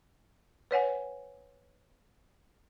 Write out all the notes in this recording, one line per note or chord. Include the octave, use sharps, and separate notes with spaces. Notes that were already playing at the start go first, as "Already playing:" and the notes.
B4 C#5 F#5 G#5